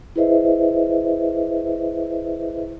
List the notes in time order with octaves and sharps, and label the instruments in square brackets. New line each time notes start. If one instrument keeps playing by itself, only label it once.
[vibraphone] E4 G#4 B4 C5 D#5 E5